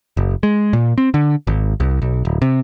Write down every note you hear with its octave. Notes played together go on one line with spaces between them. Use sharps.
F#1
G#3
A#2
C4
D3
G#1
C2
B1
D1
C3